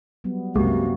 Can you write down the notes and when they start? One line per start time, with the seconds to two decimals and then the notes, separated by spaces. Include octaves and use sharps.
0.24 F#3 G3 B3
0.55 C2 F#2 C3 G#3 A#3 F#4 G4